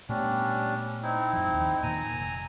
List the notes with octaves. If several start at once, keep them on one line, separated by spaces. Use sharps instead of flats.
A#2 G3 A3 B3 C#4 D4
C4 D#4 E4
F#2 F3
D#2
A#2 D#3 G#5 A#5
F1